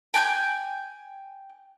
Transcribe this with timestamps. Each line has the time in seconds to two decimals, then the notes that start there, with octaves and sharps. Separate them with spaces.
0.14 G5 G#5 F#6 G6